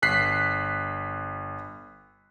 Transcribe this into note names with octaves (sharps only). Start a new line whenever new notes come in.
G1 F#6 B6 C7